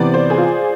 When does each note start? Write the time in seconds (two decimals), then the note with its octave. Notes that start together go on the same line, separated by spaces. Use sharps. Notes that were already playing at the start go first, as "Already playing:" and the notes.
Already playing: C3 E3 B3 C5 D5
0.14 C5
0.30 G#4
0.38 F4